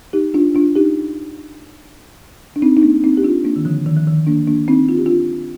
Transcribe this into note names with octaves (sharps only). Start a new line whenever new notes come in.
D#4 G4
D4 F4
D4 F4
D#4 G4
D4
C4 D#4
D#4
A#3 D4
C4 D#4
G4
D4 F4
A#3 D4
D#3
D3 F3
D#3
F3
D#3
A#3 D4
A#3 D4
C4 D#4
F4
G4
D4 F4